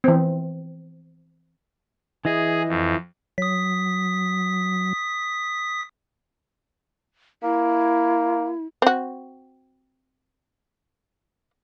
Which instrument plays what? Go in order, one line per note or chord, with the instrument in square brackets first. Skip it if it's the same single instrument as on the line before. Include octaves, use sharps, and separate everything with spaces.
[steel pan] E3 C4
[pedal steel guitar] E3 E4 D#5 [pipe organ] G#4
[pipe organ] F2
[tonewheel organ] F#3 [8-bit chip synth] D#6 B6
[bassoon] A#3 [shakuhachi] E4
[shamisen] C4 F#4